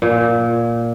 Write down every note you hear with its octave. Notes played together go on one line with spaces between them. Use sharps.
A#2